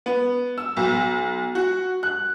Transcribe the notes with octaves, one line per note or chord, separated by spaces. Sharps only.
B3
E6
B1
F#4
F#6